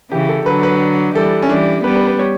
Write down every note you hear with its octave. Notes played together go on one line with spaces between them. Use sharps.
C#3 E3 G4
A4
D3 F#3 B4
B4
E3 G3 A4
C#4
E3 G3 D4
G3 B3 B4
B4
B4
C#5